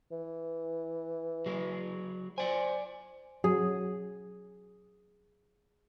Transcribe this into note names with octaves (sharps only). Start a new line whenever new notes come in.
E3
F#3 G#4
C5 D5 G5 G#5
F#3 G#4